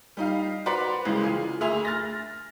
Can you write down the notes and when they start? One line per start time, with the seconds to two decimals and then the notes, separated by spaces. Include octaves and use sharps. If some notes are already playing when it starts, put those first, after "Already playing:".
0.17 G3 D#4 F5
0.66 F#4 B4 C5 D5 A#5 C6
1.05 C2 C#3 E3 G#3
1.23 F4 G#4
1.61 D2 G#4 E5 C6 F7
1.85 F6 A6 A#6